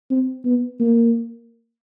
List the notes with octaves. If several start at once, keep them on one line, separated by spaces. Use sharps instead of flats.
C4
B3
A#3